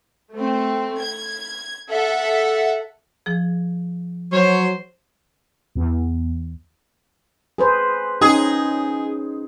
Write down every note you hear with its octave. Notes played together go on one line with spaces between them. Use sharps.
A3 C4
G#6
A4 E5 F#5
F3 G#4
F#3 C5 C#5
E2
G#4 B4 C5
C#4 D#4 G#4